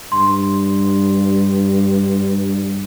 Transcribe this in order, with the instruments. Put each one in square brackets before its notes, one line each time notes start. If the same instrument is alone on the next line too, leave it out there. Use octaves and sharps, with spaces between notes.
[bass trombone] G2 [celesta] C6